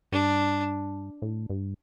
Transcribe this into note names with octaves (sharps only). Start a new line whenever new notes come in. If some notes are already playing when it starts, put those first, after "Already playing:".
G2 D4
A2
G2